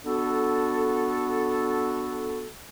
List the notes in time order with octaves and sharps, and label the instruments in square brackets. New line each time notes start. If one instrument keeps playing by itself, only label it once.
[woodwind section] B3 D4 F#4 A4